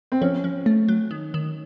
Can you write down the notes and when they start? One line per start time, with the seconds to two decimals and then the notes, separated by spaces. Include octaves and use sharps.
0.12 C4
0.21 F3 C#4
0.44 F3
0.66 A3
0.89 F#3
1.11 D#3
1.34 D#3